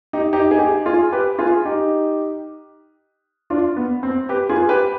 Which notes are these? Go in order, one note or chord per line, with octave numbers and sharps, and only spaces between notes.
D#4 G4
D#4 G4
G#4
D#4 G4
F4 G#4
G4 B4
F4 G#4
D#4 G4
D4 F4
B3
C4
G4 B4
F4 G#4
G4 B4